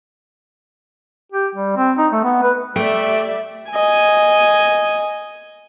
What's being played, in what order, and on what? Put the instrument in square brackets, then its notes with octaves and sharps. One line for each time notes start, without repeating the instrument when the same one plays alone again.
[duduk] G4
G3
C4
D#4
A3
B3
B4
[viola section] G3 D5 E5 [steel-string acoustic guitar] A3 [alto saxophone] G5
[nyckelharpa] D#5 G#5